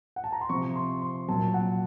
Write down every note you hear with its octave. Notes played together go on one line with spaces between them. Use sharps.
F#5
A5
A#5
C6
C3 F3 C#6
C6
C6
A#2 F#3 A5
F#5